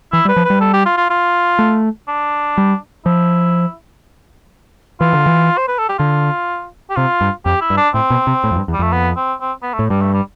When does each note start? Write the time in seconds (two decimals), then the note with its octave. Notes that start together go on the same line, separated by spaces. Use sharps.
0.13 E3 E4
0.25 G3
0.29 B4
0.36 F3
0.45 G3 B4
0.61 A4
0.74 G4
0.86 F4
0.98 F4
1.10 F4
1.59 A3
2.08 D4
2.58 G3
3.06 F3 E4
5.01 E3 F4
5.13 D3
5.26 E3
5.58 C5
5.68 B4
5.78 A4
5.89 G4
5.99 D3 F4
6.90 G4
6.96 C3 F4
7.21 G2
7.46 F2 G4
7.61 E4
7.70 G2
7.78 D4
7.94 A2 C4
8.10 B2
8.27 C3
8.44 A2
8.51 F2
8.56 G2
8.68 E2
8.73 G3
8.79 F2 A3
8.93 B3
9.17 C4
9.41 C4
9.63 B3
9.74 A3
9.79 A2
9.90 G2 G3
10.02 A3
10.14 G3